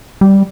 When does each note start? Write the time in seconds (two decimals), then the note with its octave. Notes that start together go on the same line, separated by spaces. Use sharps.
0.21 G3